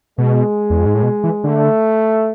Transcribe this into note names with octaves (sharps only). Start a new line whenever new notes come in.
B2 G#3
E2
F2
G#2
A2
B2
E3
D3 A3